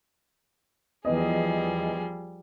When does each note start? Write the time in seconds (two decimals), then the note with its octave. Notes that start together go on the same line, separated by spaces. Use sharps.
1.05 E2 F3 G3 B3 G#4 D#5